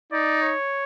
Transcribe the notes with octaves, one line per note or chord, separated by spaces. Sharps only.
D#4 D5
C#5